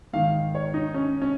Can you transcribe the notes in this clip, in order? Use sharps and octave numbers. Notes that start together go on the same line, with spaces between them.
G#2 D#3 F5
C#5
D#4
C#4
C#4